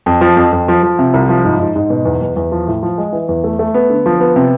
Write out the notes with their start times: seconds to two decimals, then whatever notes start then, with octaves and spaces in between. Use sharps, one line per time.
0.06 F2
0.21 F3
0.37 F2
0.52 F2
0.68 F3
0.83 F3
0.99 C3
1.14 C2
1.29 F3
1.45 G#2
1.60 G#2
1.76 G#2
1.90 B2
2.05 E2
2.22 E2
2.36 E2
2.52 F3
2.68 A2
2.83 F3
2.98 G#3
3.13 E3
3.29 E2
3.44 A3
3.59 A3
3.74 B3
3.90 D3
4.06 F3
4.20 B3
4.36 C3